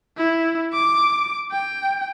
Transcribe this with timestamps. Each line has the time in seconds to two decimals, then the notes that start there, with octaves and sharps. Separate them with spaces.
0.17 E4
0.73 D6
1.52 G5